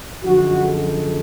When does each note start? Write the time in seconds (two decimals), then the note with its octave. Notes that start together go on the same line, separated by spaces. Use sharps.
0.23 F#2 D3 F3 G#3 F#4
0.64 A4